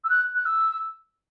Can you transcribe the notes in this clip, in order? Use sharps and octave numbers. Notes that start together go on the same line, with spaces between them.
E6
F#6
F#6
E6